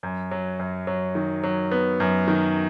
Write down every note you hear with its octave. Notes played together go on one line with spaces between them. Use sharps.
F#2
F#3
F#2
F#3
D#3
F#3
B3
F#2
D#3